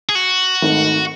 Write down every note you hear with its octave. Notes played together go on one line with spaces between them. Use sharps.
G#4
F#4
G#1 G#2 D#3 A3